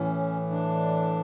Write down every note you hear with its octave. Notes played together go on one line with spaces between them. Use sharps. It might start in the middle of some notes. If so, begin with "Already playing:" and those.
Already playing: A2 E3 C#4
D4